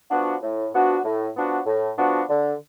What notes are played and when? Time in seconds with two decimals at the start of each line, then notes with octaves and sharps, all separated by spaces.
0.11 F3 B3 D4 F#4
0.43 A2
0.73 F3 B3 D4 F#4
1.04 A2
1.36 F3 B3 D4 F#4
1.66 A2
1.97 F3 B3 D4 F#4
2.29 D3